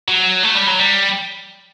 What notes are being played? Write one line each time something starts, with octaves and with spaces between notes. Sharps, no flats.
F#3
A3
G3
F#3
G3